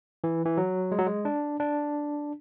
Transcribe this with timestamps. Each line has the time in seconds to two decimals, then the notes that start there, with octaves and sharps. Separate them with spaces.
0.24 E3
0.46 E3
0.58 F#3
0.92 G#3
0.99 F#3
1.06 G#3
1.25 D4
1.60 D4